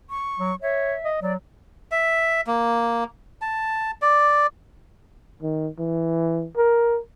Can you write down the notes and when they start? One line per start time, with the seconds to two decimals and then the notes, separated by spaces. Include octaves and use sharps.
0.10 C#6
0.38 F#3
0.62 C#5 E5
1.05 D#5
1.22 F#3 D5
1.92 E5
2.47 A#3
3.41 A5
4.02 D5
5.42 D#3
5.79 E3
6.57 A#4